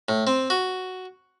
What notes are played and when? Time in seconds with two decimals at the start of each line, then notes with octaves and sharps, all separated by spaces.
0.09 A2
0.27 C4
0.50 F#4